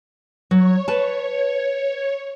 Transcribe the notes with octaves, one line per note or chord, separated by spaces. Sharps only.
F#3 C#5
B4 A5